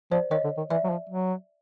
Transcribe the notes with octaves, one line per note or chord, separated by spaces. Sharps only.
F3 C5 D5
D#3 C#5 D#5
D3
D#3
E3 D5 E5
F#3
F3
F#3